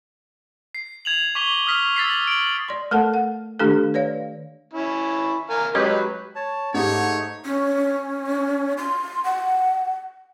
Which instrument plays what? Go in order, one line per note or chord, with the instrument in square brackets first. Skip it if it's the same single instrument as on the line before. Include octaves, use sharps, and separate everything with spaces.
[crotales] C7
G#6 F7 F#7
C#6 D6 B6 F7 G7
D#6 F6 B6
E6 A6 B6 C7
D7 F#7
[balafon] D5 C6
A3 A4 A#4 F#5 A5
F#5
D#3 A3 D4 G4 A4
B4 C#5 D5 F5
[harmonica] C#4 E4
A#4 F5 G#5
[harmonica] F#3 B4 [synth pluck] G#3 C#4 G4
[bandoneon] C#5 A5
[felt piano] G#2 G4 [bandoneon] A3 D#4 [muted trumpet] C#5
[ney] C#4
C6
F#5